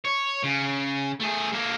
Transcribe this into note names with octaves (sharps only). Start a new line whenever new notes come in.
C#5
C#3
A3 G#4
A#3 A4